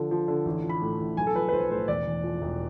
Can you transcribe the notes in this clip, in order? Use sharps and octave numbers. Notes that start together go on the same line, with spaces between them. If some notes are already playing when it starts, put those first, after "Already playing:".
Already playing: D3 F3
F3
D3
A1
F3
B5
A2
A1
B1 G#5
A4
F3 B4
B4
B1 C5
A2 C5
E1 D5
E2
F3
E1